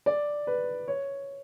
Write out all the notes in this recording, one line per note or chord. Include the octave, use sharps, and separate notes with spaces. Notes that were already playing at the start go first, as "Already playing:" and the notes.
D5
B4
C#5